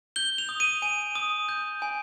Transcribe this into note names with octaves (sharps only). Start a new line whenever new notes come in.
G6 G7
F7
D#6
D#7
G#5 D#7
D#6
G6
G#5